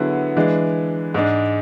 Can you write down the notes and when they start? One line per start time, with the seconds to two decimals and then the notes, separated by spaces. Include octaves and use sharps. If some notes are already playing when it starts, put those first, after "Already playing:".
Already playing: D3 F#3 B3 E4 G#4
0.37 E3 G#3 D4
1.14 G#2 G#3 D4